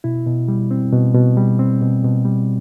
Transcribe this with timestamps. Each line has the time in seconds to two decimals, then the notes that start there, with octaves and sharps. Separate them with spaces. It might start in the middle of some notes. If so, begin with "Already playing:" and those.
0.04 B2 E4
0.26 B2
0.48 G3
0.71 C4
0.93 B2
1.14 B2
1.37 G3
1.59 C4
1.81 B2
2.04 B2
2.25 G3